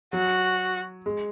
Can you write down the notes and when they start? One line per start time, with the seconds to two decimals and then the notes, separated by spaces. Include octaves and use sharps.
0.13 F#3 F#4
1.06 G#3